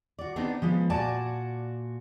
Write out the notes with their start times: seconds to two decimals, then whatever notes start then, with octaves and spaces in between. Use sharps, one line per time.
0.19 F#4 D5
0.36 B3 C4 D4 D#4
0.62 F3 G#3 B3
0.90 A#2 F#4 D5 G#5 A5